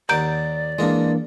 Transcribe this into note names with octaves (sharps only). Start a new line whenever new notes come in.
D#2 D5 F#5 A#5 D6 G6 D7
E3 G#3 A#3 D4 A#4